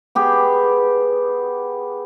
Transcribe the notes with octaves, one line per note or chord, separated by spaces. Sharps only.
B3 G4 G#4